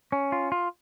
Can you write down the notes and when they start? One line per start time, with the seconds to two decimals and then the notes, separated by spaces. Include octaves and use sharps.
0.12 C#4
0.32 F4
0.52 F4